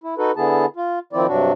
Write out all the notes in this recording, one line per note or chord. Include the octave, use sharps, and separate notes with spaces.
E4
D#4 F#4 A4 B4
D3 B3 E4 G#4 A5
F4
D#3 F3 C4 E4 D5
G2 C3 F#3 D4 F#4